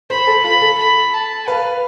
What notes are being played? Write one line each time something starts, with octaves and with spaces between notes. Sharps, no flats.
C5 B5
A4
F4 B5
A4
B5
A5
B4 F5